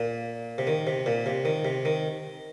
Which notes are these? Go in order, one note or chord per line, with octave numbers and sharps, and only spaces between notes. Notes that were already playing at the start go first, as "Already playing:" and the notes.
Already playing: A#2
C3
D#3
C3
A#2
C3
D#3
C3
D#3